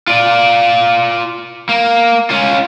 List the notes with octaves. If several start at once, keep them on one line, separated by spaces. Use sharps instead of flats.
F4 D5
A#3
C#4 F4